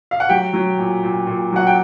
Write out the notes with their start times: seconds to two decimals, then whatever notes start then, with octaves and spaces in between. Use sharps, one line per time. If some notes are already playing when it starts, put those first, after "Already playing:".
0.11 F5
0.20 F#5
0.29 F#3 G4 G5
0.54 F#3
0.78 A#2
1.03 A#2
1.27 A#2
1.53 F#3 F#5
1.67 G5